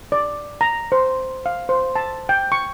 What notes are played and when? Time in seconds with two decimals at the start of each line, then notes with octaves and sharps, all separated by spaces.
0.12 D5
0.61 A#5
0.92 C5
1.46 F5
1.69 C5
1.96 A5
2.29 G5
2.52 C#6